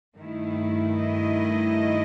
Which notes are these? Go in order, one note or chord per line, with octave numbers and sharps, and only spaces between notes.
G2 D#3 A3 E4
D#5